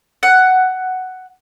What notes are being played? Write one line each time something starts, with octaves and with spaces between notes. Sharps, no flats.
F#5